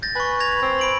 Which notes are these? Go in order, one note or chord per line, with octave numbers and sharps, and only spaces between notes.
G6 A6 A#6
B4 G#5 C#6
G#6 A#6 F7
C4
B5 D7 F#7